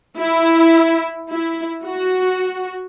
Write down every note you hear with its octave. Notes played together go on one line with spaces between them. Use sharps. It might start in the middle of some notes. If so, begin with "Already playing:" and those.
E4
E4
F#4